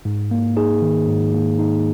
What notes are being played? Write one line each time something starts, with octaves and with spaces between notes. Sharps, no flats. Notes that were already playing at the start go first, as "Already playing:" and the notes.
G#2
A#3
D#4 G#4
D#3
G#2
A#3
D#4